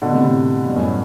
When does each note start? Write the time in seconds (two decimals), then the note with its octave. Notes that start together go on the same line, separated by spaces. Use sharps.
0.02 B2 D3
0.13 A2 C3
0.23 A2 C3
0.65 G2 B2
0.76 F#2 A2